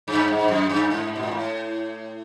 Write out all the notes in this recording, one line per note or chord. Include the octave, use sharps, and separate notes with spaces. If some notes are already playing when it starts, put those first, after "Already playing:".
G2
G#2
G2
F#2
G2
G#2
B2
A#2
A2